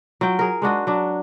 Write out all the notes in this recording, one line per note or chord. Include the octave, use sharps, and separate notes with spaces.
F#3 F4 G5
G#4 A#4
G#3 D4 F#4 D#5
F#3 D4